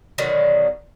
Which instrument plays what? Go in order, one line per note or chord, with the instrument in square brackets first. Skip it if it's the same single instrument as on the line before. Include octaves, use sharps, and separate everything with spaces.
[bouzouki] B2 D3 D#3 F#3